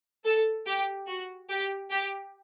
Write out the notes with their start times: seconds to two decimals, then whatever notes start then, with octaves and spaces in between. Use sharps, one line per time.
0.24 A4
0.66 G4
1.07 F#4
1.49 G4
1.91 G4